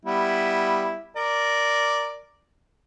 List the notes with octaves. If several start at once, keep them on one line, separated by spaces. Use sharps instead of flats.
G3 B3 E4
A#4 D5